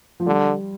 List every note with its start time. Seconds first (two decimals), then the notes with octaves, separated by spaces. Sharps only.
0.20 F3
0.26 D3 G3